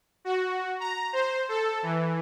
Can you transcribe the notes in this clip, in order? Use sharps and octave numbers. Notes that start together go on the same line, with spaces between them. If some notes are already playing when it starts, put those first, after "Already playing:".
F#4
A#5
C5
A4
E3